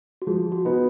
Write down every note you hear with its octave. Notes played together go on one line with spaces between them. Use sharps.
F#4
F3 G#4
F#4
B3 D#4 F#4 B4